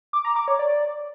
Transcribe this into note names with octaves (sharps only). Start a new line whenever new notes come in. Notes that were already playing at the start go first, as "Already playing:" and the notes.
D6
A#5
D6
C#5
D5